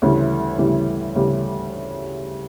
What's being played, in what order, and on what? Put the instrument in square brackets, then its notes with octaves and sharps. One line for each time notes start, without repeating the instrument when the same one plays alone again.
[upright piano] D2 C#3 E3 G3
D2 C#3 E3 G3
D2 C#3 E3 G3